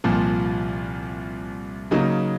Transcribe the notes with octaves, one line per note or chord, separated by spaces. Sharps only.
C2 A#2 F3
C#3 F#3 A#3 D#4